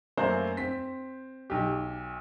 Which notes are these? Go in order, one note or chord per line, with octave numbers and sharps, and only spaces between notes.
F#2 A3 A#3 C5
C4 B6
B1 G4